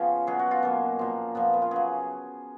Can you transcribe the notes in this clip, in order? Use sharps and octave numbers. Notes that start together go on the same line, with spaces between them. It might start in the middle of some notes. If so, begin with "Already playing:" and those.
Already playing: C#3 F3 B3 C#4 F4 G#4
B2 F#3 G#4
F#4
F4
B2 F#3 A#3
A#2 F3
A#2 F3 B3
B3
F4
C#3 F#3 G#4